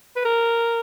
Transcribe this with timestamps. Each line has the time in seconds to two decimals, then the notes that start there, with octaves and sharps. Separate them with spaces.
0.16 B4
0.25 A#4